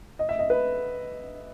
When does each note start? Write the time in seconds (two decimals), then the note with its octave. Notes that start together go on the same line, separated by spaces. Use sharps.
0.19 D#5
0.29 E5
0.39 D#5
0.50 B4